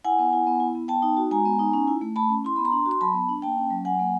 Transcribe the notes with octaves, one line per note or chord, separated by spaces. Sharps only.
E4 F#5 G#5
B3
E4
B3
E4
B3
B3 G5 A5
D#4
F#4
G#3 G#5 A#5
B3
D#4
C#4
E4
A3
A3 A5 B5
C#4
E4 C6
B3 B5
A#5 C6
D4
F#4
C6
F#3 A5 B5
B3
D4
A#3 G5 A5
C#4
F#3
F#3 F#5 G#5
A#3